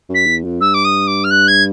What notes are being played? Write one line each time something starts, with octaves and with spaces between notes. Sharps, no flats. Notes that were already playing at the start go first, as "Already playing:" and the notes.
F#2
B6
E2
F2
G2 E6
D6
D#6
D6
F6
F#6
G#6